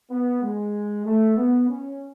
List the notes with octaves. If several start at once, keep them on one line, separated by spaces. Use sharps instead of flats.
B3
G#3
A3
B3
C#4